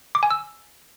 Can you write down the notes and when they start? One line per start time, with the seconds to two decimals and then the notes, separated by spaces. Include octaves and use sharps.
0.15 D6
0.23 G#5
0.31 E6